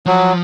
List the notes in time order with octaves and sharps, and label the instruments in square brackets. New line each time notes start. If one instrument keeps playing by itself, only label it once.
[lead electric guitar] F3 [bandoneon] F#3